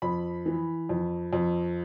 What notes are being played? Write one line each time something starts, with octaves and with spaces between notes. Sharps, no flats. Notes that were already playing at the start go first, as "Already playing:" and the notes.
F2 B5
E3
F2
F2